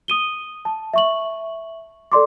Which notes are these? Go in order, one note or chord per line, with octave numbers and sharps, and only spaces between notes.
D#6 D#7 G7
A5
E5 C#6 F#7
A4 D5 C6 D6